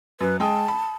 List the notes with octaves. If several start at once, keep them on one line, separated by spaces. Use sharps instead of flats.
F#2 B4
G#3 G5 A5 D#6
B5